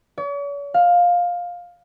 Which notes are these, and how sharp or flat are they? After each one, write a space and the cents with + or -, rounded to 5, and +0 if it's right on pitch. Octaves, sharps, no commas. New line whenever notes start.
C#5 +45
F5 +15